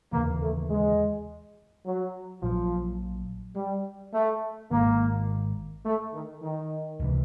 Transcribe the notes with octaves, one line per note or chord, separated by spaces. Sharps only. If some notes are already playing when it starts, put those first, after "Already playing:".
D#2 C#3 E3 A#3
A3
G#3
F#3
A#1 A#2 F3 F#3
G3
A3
G#1 G#2 D#3 A#3
A3
D#3
D#3
C#2 C3 E3